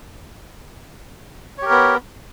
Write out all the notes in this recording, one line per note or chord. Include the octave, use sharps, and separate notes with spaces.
B3 G4 A#4 C#5